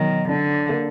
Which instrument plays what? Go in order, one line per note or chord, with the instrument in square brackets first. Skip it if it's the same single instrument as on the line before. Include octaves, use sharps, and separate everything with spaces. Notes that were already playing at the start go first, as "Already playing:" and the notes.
Already playing: [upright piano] B2 F#3 [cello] D#3
[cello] D3 [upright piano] D4
[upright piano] A#3